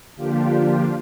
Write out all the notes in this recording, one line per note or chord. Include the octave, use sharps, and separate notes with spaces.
D3 F3 A#3 D4 F4 G4